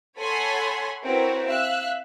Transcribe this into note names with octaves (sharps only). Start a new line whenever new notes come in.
A4 C#5 F#5 G#5 B5 C6
C4 E4 F#4 A#4 B4 C#5
E5 F5 E6 F#6